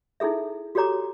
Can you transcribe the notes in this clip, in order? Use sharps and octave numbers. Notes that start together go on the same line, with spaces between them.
D#4 E4 G#4 A4 E5
F#4 G4 A4 C#5 A#5 D6